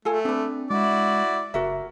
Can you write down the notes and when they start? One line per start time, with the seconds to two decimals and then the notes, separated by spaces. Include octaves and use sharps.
0.05 A3 F4 A4 G#5
0.25 C4 D4 B4
0.70 G#3 E4 F#4 D5
1.54 F#1 F#4 A#4 E5